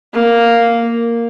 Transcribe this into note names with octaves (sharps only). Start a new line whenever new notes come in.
A#3